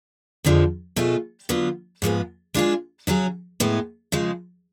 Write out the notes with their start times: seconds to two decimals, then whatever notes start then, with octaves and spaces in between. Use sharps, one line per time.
0.44 F2 D3 F3 G#3
0.96 B2 A3 F4 G#4
1.49 D3 F#3 B3 F4
2.02 G#2 F3 G#3 B3
2.54 G#3 D4 F4 G#4
3.07 C#3 F#3 C#4 G#4
3.60 A2 G#3 B3
4.12 C#3 F3 G#3